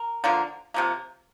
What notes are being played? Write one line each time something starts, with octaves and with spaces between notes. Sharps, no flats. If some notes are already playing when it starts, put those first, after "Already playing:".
Already playing: A#4
D3 F3 A#3
C3 F3 A#3